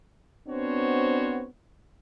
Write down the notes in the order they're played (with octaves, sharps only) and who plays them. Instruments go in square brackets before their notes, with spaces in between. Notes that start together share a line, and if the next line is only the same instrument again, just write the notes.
[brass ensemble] B3 C4 D4 F#4 C5 C#5